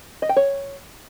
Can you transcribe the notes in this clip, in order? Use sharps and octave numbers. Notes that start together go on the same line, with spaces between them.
D#5
G5
C#5